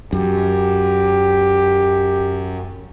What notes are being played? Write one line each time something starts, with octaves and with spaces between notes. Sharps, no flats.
F#2 G4